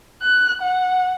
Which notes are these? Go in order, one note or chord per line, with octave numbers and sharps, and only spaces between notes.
F#6
F#5